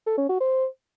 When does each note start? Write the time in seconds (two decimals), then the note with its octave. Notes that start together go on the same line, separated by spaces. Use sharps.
0.06 A4
0.18 C#4
0.29 F#4
0.40 C5